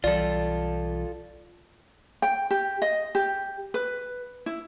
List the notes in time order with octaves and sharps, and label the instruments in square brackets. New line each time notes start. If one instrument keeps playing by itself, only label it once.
[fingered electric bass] B1 E3 G3 [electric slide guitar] F4 A4 [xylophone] D5
[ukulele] G5
G4
D#5
G4
B4
E4